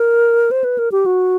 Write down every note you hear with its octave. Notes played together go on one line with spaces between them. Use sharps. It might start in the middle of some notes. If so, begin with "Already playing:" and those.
Already playing: A#4
C5
B4
A#4
G4
F#4